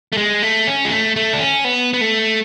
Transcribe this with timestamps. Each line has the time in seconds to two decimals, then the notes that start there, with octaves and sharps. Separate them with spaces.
0.13 A3
0.17 G#3
0.43 A3
0.67 C#4
0.85 G#3
0.91 A3
1.16 A3
1.33 D4
1.40 C#4
1.65 B3
1.94 B3
2.01 A3